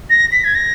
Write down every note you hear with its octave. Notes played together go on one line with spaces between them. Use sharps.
A#6
B6
G#6
A#6